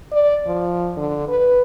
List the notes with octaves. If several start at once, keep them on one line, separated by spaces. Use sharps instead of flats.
D5
F3
D3
B4